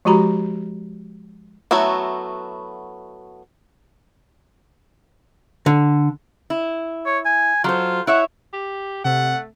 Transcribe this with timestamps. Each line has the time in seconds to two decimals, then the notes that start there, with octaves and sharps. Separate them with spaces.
0.05 F3 G#3 F#4 G4 A#5 B5
1.71 F#3 A3 B3 E4 F#4
5.66 D3
6.50 E4
7.06 C#5
7.25 G#5
7.64 F#3 F4 A4 C5
8.07 E4 C#5 E5 F#5
8.53 G4
9.05 C3 A3 F#5